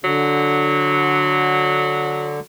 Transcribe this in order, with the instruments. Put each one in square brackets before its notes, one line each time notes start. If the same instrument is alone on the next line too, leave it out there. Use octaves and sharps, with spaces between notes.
[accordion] D3 [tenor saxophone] F#3